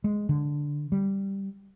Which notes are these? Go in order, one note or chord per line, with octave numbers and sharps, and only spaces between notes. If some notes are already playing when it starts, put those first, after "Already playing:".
G#3
D3
G3